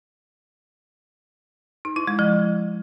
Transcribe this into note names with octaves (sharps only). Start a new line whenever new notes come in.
D#4
E4
G#3
F3